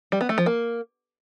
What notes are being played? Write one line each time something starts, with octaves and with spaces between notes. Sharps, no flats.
G3
B3
A3
F3
A#3